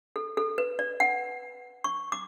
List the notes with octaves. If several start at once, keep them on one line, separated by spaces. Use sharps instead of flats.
A4
A4
B4
D5
F#5
C#6
D6